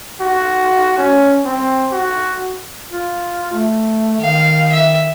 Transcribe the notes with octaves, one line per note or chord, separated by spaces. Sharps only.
F#4
C#4
C4
F#4
F4
A3
D#3 F5
E5